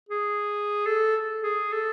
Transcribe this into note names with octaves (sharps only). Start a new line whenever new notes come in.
G#4
A4
G#4
A4